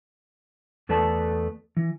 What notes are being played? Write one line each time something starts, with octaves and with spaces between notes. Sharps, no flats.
E2 A3 A4 B4 D5 A5
E3